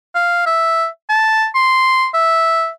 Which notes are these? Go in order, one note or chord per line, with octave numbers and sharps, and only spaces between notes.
F5
E5
A5
C6
E5